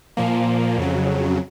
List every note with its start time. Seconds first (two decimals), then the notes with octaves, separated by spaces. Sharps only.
0.17 A#2 F3 A#3
0.78 F2 C#3 F#3